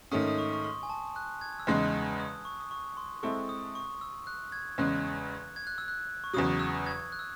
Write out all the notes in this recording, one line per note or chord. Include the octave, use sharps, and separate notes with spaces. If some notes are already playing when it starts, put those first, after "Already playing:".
G#2 D#3 A3 C#4 D#6
D#6
C#6
C#6
C6
G#5
A5
F#6
G#6
E6
E2 C#3 G#3 D#4 F#6
D#6
C#6
D#6
C#6
C6
G#3 C4 E4 A4 C#6
D#6
C#6
E6
F#6
G#6
E2 C#3 G#3 C#4 F#6
G#6
F#6
E6
F#6
C#6
E2 C#3 F#3 D#6
E6
G#6
F#6
E6